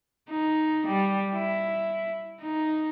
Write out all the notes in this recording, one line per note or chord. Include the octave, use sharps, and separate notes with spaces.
D#4
G3
E4
D#4